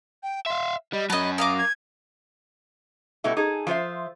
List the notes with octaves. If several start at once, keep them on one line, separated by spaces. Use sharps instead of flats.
G5
E5 F5 C6
G3 D#5
F#3 C#4 D#5 A5 B5
A#4 F5 D6 D#6
G#6
B2 G3 A3 E4
D#4 G#4 A4
F3 F4 C5 E5